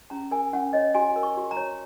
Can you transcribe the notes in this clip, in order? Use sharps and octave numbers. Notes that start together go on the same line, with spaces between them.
C#4 A#5
A#4 G#5
C#4 F#5
C#5 D#5
F#4 G#5
A#4
C#6
F#4
A#5
C#5